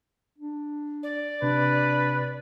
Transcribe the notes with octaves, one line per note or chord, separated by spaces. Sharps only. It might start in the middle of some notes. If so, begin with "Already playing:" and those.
D4
D5
C3 D4 B4